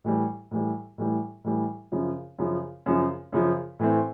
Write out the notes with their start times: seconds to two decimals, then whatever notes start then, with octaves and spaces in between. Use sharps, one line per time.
0.04 A2 E3 G3
0.51 A2 E3 G3
0.98 A2 E3 G3
1.44 A2 E3 G3
1.92 F#2 C#3 F3
2.38 F#2 C#3 F3
2.86 F#2 C#3 F3
3.32 F#2 C#3 F3
3.79 A2 E3 A3 C4